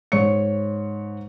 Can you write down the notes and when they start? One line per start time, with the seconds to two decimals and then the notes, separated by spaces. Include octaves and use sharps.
0.12 G#2 C#5 C#6 C#7